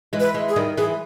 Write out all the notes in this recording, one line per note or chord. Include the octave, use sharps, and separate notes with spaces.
E3 G#3
B4
E3 G#3
G#4
D#3 G3
E3 G#3 G#4